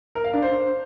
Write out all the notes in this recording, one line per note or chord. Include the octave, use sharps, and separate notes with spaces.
A#4
F5
D4
C5